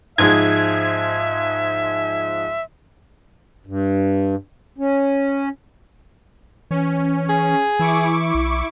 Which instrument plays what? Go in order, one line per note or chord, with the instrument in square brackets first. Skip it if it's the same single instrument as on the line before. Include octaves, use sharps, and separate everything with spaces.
[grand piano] G#2 F3 G#3 [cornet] E5 [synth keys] G#6
[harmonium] G2
C#4
[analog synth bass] E3 [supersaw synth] C#4
[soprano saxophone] G#4
[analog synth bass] E3 [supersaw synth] E4 C#6 D6
[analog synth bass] B1